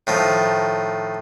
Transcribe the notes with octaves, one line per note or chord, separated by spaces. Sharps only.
A2 D#3 F3